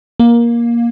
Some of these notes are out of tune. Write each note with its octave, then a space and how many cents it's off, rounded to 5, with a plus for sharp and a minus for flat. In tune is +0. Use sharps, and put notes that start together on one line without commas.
A#3 +15